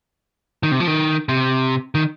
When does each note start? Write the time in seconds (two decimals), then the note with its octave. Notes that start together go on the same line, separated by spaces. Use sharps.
0.63 D#3
0.72 C3
0.80 F3
0.87 D#3
1.29 C3
1.95 D#3